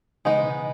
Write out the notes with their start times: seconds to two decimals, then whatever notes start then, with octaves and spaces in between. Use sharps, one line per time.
0.25 C#3 E3 G#3 B3 D#4
0.43 B2